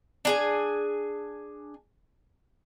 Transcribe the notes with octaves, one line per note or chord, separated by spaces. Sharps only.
D4 G#4 G#5